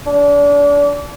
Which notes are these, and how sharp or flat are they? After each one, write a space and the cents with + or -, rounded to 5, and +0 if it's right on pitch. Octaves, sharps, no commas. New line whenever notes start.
D4 -30